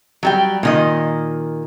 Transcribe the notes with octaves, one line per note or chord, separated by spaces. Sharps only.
F#3 G3 G5
A#2 D#3 D#5